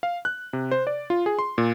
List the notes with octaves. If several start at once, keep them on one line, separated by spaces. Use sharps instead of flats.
F5
F#6
C3
C5
D5
F4
G#4
C6
A#2